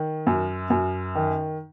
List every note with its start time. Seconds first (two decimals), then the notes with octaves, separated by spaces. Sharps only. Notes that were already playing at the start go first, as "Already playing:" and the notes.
Already playing: D#3
0.27 F#2
0.70 F#2
1.15 D#3